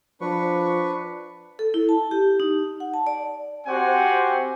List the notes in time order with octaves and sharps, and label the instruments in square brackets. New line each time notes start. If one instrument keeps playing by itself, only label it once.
[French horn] F3 [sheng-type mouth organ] D4 B4 C#6
[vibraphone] A4
E4
A5
G4
D#4
F#5
A5
D5
[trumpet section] C4 F#4 G4 C5 F#5 G#5